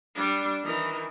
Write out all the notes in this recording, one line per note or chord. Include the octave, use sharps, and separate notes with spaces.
G3 D4
D#3 E3